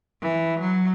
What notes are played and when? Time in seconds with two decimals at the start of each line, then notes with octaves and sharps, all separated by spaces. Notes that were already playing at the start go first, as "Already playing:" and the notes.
0.23 E3
0.61 F#3